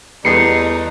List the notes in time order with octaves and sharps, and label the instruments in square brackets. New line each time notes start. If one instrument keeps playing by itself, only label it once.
[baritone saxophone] E2 [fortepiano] G3 A3 B3 [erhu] D#4 [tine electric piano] C7 C#7